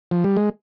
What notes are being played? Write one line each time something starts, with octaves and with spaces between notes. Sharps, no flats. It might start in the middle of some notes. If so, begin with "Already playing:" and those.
F3
G3
G#3